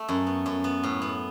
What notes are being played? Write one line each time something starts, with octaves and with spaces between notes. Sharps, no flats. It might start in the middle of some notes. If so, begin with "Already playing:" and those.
Already playing: A3
F#2
B3
F#2
B3
A2
B3